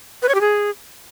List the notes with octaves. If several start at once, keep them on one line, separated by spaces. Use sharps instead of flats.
B4
C#5
G4
G#4